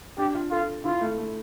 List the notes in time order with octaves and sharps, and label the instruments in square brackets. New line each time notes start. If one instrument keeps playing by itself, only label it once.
[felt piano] D4 [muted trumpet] G4
[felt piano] F4
[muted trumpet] F4 [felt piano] A4
[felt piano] E4 [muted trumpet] F4
[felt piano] A3
A3